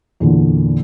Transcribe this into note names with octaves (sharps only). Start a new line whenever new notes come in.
E2 A#2 D3